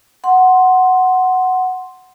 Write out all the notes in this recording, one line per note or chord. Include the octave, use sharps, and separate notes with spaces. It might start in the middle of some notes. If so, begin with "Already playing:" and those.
F#5 C6